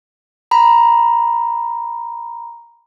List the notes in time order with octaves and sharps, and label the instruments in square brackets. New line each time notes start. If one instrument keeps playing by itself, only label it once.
[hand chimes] A#5 B5